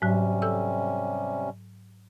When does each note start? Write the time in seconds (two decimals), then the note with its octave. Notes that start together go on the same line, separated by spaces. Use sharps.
0.02 G#2 C3 F#3 G3 C#4
0.42 A4 E6